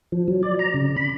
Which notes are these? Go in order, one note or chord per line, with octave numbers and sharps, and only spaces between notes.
F3
F#3
D5
A#5
C#3
B5